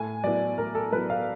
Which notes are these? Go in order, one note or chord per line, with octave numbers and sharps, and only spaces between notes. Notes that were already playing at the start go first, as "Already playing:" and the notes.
Already playing: A2 G#5
F#3 B3 E4 D5
A2 A#4
A4
F#3 B3 E4 B4
F5